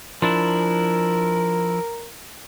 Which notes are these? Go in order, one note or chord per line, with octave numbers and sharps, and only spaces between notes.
F3 D4 E4 A#4